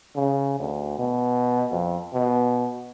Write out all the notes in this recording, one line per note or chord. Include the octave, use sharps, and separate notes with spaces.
C#3
D2
B2
F2
B2